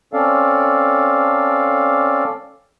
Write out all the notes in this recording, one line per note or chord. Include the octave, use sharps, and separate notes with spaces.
C4 C#4 A4 D5 F5